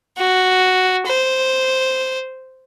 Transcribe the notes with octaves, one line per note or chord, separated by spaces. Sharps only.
F#4
C5